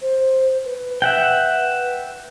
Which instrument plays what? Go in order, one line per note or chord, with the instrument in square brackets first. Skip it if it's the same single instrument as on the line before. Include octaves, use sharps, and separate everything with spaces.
[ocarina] C5
B4
[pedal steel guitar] E5 F#5 G5